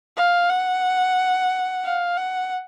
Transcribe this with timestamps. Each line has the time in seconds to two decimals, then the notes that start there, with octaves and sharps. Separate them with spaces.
0.17 F5
0.50 F#5
1.84 F5
2.17 F#5